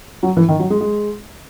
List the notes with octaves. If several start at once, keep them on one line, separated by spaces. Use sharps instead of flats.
F#3
E3
D#3
F#3
G#3
G#3